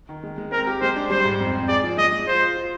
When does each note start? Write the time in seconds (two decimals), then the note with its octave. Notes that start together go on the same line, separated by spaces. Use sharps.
0.09 D#3
0.23 G#3
0.38 G#3
0.52 C4 A#4
0.67 G4
0.81 G#3 C5
0.96 D4
1.10 G3 C5
1.25 G#2
1.39 F2
1.55 F2
1.68 G#4 D5
1.84 F3
1.97 G#3 D#5
2.12 G#3
2.27 F4 C5
2.41 F4
2.57 F4